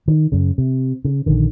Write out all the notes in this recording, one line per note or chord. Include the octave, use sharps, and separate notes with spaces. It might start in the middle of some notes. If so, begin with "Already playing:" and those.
D#3
F#2 C#3
C3
C#3
A#1 D3 D#3